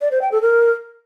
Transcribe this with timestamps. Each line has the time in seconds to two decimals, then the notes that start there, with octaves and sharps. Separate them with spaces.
0.01 D5
0.11 C5
0.22 G5
0.32 A4
0.42 A#4